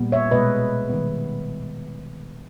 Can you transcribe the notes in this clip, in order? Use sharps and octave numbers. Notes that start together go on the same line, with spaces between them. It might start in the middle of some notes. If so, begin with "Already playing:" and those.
Already playing: A#2 G3 B3
C#5 E5
B2 G#3 B3 B4 D#5
D#3 G3 B3